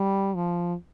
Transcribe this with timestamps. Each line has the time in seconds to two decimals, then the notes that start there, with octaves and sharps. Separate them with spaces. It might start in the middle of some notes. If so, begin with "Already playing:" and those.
Already playing: G3
0.35 F3